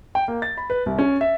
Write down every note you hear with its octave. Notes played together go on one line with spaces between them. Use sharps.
G5
A#3
A6
B5
B4
C2
C#4
E5